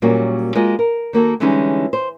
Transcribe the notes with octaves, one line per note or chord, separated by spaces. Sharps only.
A#2 F#3 G3 A#3 C#4 F#4
G#3 A#3 F4 F#4 D#5
A#4
D#3 A#3 F#4 A4
D3 E3 G3 G#3 C#4 D#4
C5